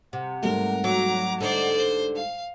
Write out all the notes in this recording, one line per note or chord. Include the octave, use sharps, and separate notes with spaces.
C3 F#5
G#2 G3 A3 A#4
F#3 A#5 D6
D3 D#4 C5 D5
C5
F5